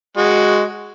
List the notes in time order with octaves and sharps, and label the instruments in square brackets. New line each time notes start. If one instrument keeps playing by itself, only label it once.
[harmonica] G#3 F#4